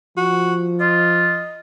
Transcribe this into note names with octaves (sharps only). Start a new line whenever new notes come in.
F3 F#4
F4 D#5